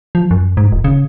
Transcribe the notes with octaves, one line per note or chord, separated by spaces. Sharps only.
F3
F#2
G#2
D#1
C#3